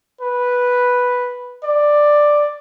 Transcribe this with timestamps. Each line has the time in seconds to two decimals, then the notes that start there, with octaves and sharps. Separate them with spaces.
0.21 B4
1.64 D5